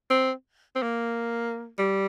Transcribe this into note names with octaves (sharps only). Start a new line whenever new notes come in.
C4
C4
A#3
G3